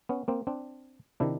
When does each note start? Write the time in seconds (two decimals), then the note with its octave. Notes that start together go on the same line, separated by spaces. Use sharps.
0.09 B3 C#4
0.28 A#3 C4
0.47 C4 D4
1.20 C3 D#3 D4 E4